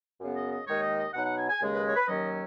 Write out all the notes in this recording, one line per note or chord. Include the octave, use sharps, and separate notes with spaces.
F#2 C#3 B3
D#5
D#5
D#2 D#3 G#3 D#4 C#5
D#5
D#5
B2 F#3 D#4 F#5
F#5
G#5
G#5
D#2 C#3 G#3
B4
C#5
B4
D#2 D#3 F#3 C#4 D#5